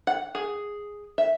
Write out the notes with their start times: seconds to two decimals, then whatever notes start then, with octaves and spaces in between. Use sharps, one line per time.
0.07 F#5
0.35 G#4
1.18 E5